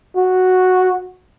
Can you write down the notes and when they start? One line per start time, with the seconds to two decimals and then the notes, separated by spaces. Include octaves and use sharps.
0.17 F#4